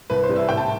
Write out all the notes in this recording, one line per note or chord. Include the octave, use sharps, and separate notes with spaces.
C2 B4
C5
C3 E3 G3
E5
A1 G5
A5